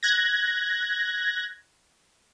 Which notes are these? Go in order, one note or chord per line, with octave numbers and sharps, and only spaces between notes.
F#6 G#6 A#6